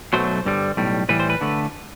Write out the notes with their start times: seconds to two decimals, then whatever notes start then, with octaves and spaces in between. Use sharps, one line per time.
0.13 B1 B2 F#3 A3 C5
0.45 G2 D3 G3
0.77 B1 A2 G3
1.09 A2 E3 G3 B4
1.20 C5
1.30 B4
1.41 D3 A3